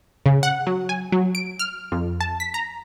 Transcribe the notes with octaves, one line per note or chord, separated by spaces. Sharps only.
C#3
F#5
F#3
G#5
F#3
D7
F6
F2
A5
B6
A#5